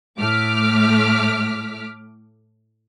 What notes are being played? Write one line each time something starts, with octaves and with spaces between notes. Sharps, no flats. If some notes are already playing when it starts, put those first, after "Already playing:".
A2 A3 D6 F6 B6